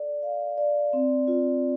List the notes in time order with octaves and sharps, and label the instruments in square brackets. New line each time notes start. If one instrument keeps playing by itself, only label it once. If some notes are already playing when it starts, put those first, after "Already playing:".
Already playing: [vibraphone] A4 D5
F5
D5
C4
F4